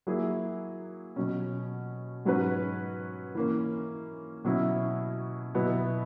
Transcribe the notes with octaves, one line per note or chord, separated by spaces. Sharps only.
F#3 A#3 E4 G#4
B2 F#3 C#4
G#2 F#3 C#4 F#4 B4
E3 A#3 C#4
B2 F#3 C#4 E4
B2 F#3 B3 E4